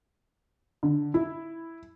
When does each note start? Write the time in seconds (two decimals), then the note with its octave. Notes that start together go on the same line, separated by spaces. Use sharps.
0.83 D3
1.14 E4